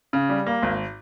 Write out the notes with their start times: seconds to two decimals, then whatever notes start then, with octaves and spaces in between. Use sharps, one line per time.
0.13 C#3
0.29 G3
0.47 A#3
0.62 G#1